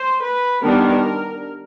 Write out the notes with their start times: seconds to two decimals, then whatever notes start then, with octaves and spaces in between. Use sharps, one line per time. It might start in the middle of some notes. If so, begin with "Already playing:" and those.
Already playing: C5
0.23 B4
0.64 D#3 G3 B3 D4 A#4